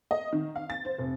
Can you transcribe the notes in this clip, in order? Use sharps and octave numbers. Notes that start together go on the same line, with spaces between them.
D#5
D#3
F5
A6
C5
F1